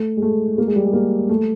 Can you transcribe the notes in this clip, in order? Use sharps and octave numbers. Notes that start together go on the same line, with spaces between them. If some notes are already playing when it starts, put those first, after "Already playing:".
Already playing: A3
G#3
A3
A#3
G#3
G3
G#3
A#3
A3